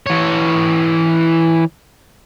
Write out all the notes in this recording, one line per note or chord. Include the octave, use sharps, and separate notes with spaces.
E3 C#5